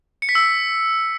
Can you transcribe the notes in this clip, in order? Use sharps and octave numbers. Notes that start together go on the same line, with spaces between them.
C#7
B6
E6